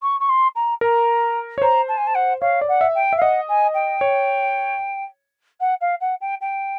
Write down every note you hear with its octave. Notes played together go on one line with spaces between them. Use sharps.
C#6
C#6
C6
A#5
A#4 A#5
C#5
C5 A#5
A5
G#5
A5
F#5
C#5 F5
D5
F#5
E5
G5
E5
F5
D#5 F#5
G#5
G5
C#5
F#5
F5
F#5
G5
G5